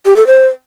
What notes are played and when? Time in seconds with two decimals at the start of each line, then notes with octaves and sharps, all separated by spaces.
0.06 G4
0.16 A4
0.27 C5